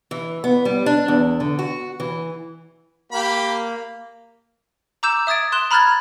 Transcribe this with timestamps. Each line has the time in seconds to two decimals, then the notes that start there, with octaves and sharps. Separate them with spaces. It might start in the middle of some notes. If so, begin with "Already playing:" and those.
0.11 E3
0.44 B3
0.65 G3
0.86 D4
1.08 E2
1.40 D3
1.59 F#4
2.00 E3
3.12 A#3 G4 B5
5.03 A#5 D6 E6 G6 E7
5.27 E5 D#6 G#6 A6 D7
5.52 C6 F#6 E7 G7
5.71 A#5 B5 F6 F#6 G#6 A6